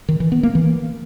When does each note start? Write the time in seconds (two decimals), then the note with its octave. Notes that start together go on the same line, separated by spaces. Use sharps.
0.09 D#3
0.20 E3
0.32 B3
0.43 A#3
0.55 E3